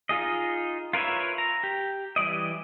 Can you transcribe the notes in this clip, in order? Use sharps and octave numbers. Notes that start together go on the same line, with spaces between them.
D#4 F4 G#4 D#5
F4 A#4 B4 C#5 E5
A#5
G4
E3 G3 D5 D#5